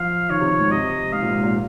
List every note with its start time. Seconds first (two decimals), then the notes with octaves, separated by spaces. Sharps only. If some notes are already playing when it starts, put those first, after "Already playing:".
Already playing: F3 F5
0.30 D#3 C#5
0.40 C3
0.50 C3
0.60 G#2
0.71 C3 D#5
1.13 G#2 F5
1.22 A#2
1.32 G#2
1.44 A#2